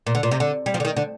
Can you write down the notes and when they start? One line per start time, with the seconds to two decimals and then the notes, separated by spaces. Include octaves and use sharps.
0.07 A#2
0.15 D3
0.23 A#2
0.31 C3
0.40 D3
0.66 G3
0.74 F3
0.80 D3
0.85 D#3
0.96 D3